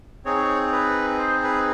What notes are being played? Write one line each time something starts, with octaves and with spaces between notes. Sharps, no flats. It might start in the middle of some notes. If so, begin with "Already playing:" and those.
C4 D#4 G#4 C#5
B4
C5
B4